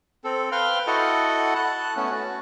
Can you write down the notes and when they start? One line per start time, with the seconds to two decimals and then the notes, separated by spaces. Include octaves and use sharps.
0.24 C4 A4
0.52 B4 F5 G5 C6 F6
0.87 E4 F#4 A4 D#5 F#5 A5
1.56 A5 F#6
1.96 A3 B3 C#4
2.10 F#4